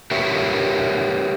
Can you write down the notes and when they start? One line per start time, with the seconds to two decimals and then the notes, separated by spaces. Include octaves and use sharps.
0.11 G4 A#4 B4 C#5 E5